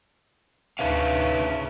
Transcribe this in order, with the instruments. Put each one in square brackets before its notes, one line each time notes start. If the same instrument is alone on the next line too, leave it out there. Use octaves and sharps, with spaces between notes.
[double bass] D2 [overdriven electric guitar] C#3 C#4 [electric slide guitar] D#4 B4 F5 [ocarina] E5